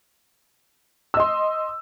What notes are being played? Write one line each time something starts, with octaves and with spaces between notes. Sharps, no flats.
D#5 C6 E6